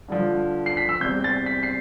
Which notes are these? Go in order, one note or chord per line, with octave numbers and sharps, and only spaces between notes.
G2 D3 F3
C7
B6
E6
E2 C3 G3 C4 G6
A6
B6
C7